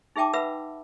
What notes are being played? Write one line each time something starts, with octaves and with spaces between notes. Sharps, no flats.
D#4 G#4 E5 G5 A5 D6
B4 E5 F#5 B5 E6